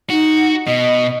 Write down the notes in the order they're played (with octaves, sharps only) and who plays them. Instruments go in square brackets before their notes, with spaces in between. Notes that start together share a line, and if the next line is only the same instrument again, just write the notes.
[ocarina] D#4 [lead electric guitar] F#4
[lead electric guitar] B2 [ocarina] D#5